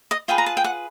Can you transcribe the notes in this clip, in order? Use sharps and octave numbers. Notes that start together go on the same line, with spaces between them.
D#5
F4 G#4 B4 G5
A#5
A5
G5
F#5